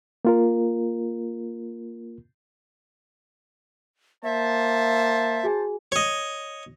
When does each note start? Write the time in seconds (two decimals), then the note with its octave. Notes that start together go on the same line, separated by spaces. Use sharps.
0.25 A#3 F4 A#4
4.24 A#3 C5 E5 A5
5.43 F#4 G#4 G#5
5.92 C#5 D#5